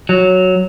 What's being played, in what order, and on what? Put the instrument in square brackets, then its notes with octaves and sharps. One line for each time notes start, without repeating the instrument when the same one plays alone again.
[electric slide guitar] F#3